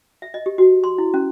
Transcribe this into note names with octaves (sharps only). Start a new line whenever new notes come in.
E5
D#5
G4
F#4
C6
E4
C#4